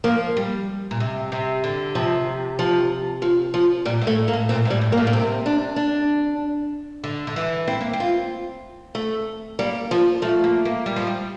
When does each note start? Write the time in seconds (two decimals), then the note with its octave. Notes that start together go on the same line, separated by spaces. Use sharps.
0.04 F3 A#3
0.37 G3
0.91 A#2
1.00 C3
1.32 C3
1.64 D3
1.95 C3 F3
2.59 F3
3.22 F3
3.54 F3
3.85 A#2 G3
4.01 A2
4.07 A3
4.28 A#3
4.33 A2
4.49 A#2 C4
4.65 A2
4.70 G3
4.82 G2
4.92 A#3
4.97 A2
5.07 A#3
5.13 C3 C4
5.46 D4
5.76 D4
7.04 D3
7.27 D3
7.36 E3
7.68 C4 E4
7.81 A#3
7.93 C4
8.00 F4
8.95 A3
9.59 G3 A#3
9.91 F3
10.22 F3 A3
10.44 A#3
10.65 A#3
10.86 G3
10.96 F3
11.07 G3